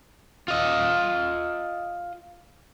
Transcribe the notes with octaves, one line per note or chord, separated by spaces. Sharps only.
F4 D#5